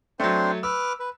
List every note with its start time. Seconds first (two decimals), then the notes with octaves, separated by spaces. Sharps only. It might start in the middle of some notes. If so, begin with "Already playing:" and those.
0.20 F#3 A3 C4 D4 C5
0.63 B4 D6 E6 F6
1.00 B4